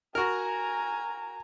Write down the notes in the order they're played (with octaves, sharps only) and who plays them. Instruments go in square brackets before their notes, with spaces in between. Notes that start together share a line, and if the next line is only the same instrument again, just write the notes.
[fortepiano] F#4 A#4 [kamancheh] G#5 A#5